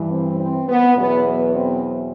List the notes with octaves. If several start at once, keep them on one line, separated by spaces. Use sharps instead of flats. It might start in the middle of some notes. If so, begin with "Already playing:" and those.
Already playing: G2 E3
C4
C4
B3
E2 B2 F#3 B3
B3
C4